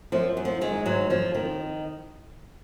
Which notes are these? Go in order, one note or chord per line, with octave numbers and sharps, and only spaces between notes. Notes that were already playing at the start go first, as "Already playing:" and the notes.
F#2 F3
F#2
F3
D#3 G#3
G#2 F#3
F2 F3
D#3